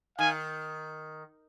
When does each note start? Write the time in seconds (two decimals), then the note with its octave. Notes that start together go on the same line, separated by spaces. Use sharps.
0.18 D#3 F5 G#5